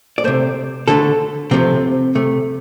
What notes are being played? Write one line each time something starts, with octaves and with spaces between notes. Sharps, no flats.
D5
C3 A3 C5
D3 A3 A4
C3 F3 A3 C4
C3 A3